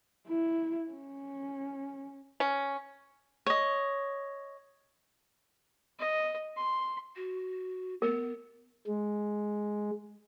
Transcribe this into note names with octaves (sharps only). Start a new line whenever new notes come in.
E4
C#4
C#4
C#5 D#5
D#5
C6
F#4
B3 A#4
G#3